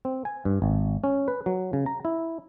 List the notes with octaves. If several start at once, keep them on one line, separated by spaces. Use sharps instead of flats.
C4
G#5
G2
G#1
C#4
B4
F#3
C#3
A#5
E4